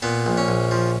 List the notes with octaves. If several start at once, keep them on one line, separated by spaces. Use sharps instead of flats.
A#2 B3
A#1
C#4
A#1
F3